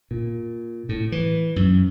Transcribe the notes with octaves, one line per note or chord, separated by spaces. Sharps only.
A#2
A2
E3
F#2